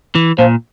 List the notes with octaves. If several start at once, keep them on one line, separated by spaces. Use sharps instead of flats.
E3
A#2 F3